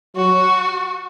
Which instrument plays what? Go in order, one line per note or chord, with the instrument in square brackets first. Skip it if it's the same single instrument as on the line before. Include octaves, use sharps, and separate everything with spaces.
[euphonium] F#3 [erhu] F#4